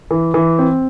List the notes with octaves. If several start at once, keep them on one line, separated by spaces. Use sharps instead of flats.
E3
E3
C4